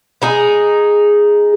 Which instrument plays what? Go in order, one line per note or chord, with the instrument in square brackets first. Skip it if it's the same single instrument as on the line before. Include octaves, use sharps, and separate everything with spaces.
[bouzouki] G#3 D#4 G#4